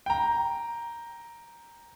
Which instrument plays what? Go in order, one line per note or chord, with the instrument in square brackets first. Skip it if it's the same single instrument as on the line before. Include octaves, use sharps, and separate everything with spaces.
[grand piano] G5 A#5